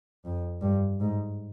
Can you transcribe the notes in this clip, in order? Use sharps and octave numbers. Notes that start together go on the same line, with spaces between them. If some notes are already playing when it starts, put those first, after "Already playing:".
F2
G2
G#2